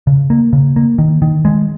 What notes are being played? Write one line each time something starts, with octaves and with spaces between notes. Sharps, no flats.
C#3
A#3
C#3
A#3
D#3
D#3
G#3